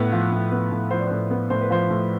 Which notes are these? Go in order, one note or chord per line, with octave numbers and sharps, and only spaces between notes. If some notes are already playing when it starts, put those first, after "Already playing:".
Already playing: A2 B3 B4
F3
A2
B3
A2
F3 C5
D5
A2 C5
B3
A2 C5
B4
F3 C5
A2